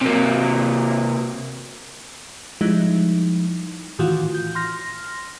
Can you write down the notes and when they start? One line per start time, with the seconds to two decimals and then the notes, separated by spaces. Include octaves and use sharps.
0.01 C3 A#3
2.61 F3 G3 G#3 D#4 E4
3.99 A2 D#3 E3 F4 F#4
4.34 G6
4.55 C6 F6 A#6